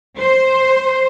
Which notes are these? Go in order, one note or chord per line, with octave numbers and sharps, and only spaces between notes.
C5